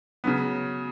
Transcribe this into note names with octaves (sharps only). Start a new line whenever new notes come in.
C#3 F#3 B3